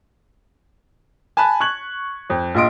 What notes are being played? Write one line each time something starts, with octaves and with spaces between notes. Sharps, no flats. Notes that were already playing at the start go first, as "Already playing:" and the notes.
G#5 A5 B5 F#6
C#6 F#6 G#6 F#7
F2
A#1 F4 D#5 C6 D7